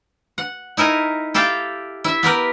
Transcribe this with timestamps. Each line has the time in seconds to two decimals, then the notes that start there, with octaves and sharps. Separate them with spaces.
0.38 F#5
0.77 D#4 E4 A#4 G#5
1.34 E4 G4 A4 F5 G5
2.04 E4 E5
2.23 B3 G4 A#4 B4